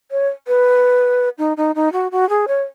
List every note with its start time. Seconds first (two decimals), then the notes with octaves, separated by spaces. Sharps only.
0.11 C#5
0.48 B4
1.38 D#4
1.57 D#4
1.75 D#4
1.92 F#4
2.12 F#4
2.29 G#4
2.48 C#5